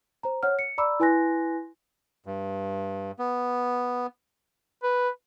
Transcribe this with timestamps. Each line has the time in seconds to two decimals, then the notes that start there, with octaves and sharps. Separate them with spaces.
0.23 C5 A#5
0.43 C#5 F#5 F6
0.59 C#7
0.78 D5 A#5 B5 D6 E6
1.00 E4 B4 G#5 C6 F#6 A#6
2.26 G2
3.19 B3
4.83 B4